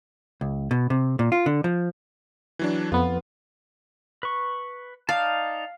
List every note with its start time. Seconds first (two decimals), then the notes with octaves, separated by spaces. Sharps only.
0.41 C#2
0.71 B2
0.90 C3
1.19 A#2
1.32 F4
1.46 D3
1.64 F3
2.59 E3 F#3 D4
2.92 F2 B3 F4
4.23 B4 C#6
5.09 D#4 D5 F5 A5